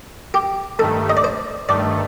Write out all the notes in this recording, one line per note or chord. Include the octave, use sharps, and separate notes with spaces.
G4
G2 D#3 A3 A4
D#5
D5
C5
G2 D#3 A3 D5